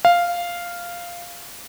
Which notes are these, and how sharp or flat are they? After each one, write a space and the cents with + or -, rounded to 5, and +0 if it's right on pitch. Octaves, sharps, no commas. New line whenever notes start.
F5 -5